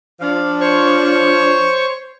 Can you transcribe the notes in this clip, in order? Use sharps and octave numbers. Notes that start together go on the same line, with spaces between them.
F3 D4 F5
C5 C#5 C#6